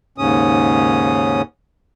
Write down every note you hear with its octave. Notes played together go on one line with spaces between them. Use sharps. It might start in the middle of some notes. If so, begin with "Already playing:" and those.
D#2 G#2 C#3 C#4 D#6